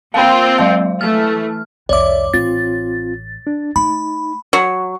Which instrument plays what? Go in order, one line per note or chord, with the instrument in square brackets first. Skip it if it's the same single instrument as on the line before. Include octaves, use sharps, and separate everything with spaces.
[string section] A#3 C4 F4 [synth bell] F5 G5
[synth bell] F#3 G#3 F5
[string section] E3 A3 [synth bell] F6
[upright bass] C2 F2 [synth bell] C#5 D6 [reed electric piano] D5 E5
[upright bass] A1 [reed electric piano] C4 F4 [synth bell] A6
[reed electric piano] D4
[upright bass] A3 [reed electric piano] D#4 [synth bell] B5
[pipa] F#3